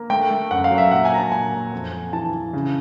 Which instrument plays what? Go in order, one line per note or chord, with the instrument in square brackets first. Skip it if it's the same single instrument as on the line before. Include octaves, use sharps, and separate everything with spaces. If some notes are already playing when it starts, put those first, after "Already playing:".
Already playing: [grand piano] A#3
A3 G5
A3
F#2 F#5
F5
F#3
E5
A#2 F#5
G#5
A#3 A#5
A5
A#2 G#5
A#2
F2
F2
E3 A5
E3
C#3